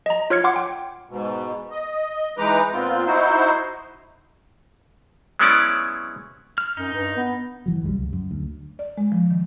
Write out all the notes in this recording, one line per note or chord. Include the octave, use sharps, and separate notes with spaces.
D#5 A#5
F4 C#5 F6 G#6 C#7
F#5 C6 D6
G5
G#2 B2
D#5
E3 G#3 D#4 B4 A#5 D6
A#2 B3 C4 F4
D#4 E4 F#4 C5
F#3 G#3 B3 C#4 E4 D5
F6
F#2 D#4
G2
B3
G1 E3 F#3
C2 F#2 F#3 G3
C#2
F#2
D2
D5
G#3
F3
D#3